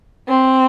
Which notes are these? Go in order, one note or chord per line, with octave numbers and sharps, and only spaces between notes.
C4